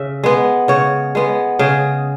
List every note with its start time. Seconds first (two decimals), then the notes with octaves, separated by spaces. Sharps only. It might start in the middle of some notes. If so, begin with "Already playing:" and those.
Already playing: C#3 E5
0.24 G#3 B3
0.68 C#3 C#5
1.15 G#3 B3
1.59 C#3 G#4